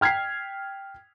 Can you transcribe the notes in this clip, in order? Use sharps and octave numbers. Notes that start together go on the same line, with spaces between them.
G5 F6 G#6 B6 C7